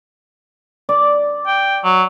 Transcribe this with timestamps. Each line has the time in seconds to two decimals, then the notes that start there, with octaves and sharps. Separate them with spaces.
0.89 D5
1.47 G5
1.84 F#3